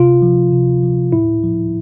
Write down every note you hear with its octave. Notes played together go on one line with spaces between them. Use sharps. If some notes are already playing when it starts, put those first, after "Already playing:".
Already playing: C3 F4
F3
C3
F3
A2 E4
F3